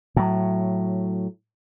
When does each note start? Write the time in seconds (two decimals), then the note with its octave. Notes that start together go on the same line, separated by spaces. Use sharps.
0.16 A2 F#3